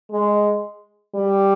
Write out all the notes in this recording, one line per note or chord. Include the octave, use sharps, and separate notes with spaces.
G#3
G3